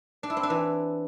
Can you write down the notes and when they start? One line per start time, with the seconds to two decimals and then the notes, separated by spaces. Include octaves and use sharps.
0.23 D4
0.30 E4
0.37 C4
0.43 D4
0.50 E3